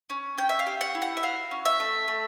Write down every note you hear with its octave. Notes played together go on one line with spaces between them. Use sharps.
C#4
C#4 G5
E5
F5
G4
F#5
E4
F#5
E5
F#4 F5
C#4
E5
A3
A3